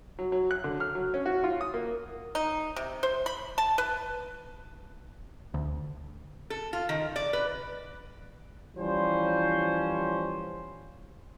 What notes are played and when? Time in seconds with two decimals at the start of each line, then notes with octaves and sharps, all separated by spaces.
0.19 F#3
0.32 F#3
0.51 F#6
0.64 D3
0.80 F6
0.95 F#3
1.14 C#4
1.26 F#4
1.44 F4
1.61 D#6
1.74 A#3
2.35 D#4
2.76 C3
3.03 C5
3.26 B5
3.58 A5
3.78 B4
5.54 D2
6.50 A4
6.73 F4
6.89 D#3
7.16 D5
7.33 B4
8.77 E3 F3 G3 C#4 C5